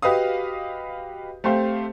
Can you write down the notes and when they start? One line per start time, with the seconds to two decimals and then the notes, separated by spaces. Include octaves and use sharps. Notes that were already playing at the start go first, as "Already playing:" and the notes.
0.02 F#4 G4 B4 D#5 F5 D#6
1.44 A3 C4 G4 C5 F5